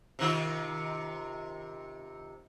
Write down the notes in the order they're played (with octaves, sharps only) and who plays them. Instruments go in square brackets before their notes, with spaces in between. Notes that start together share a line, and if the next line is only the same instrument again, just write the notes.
[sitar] C3 D#3 F4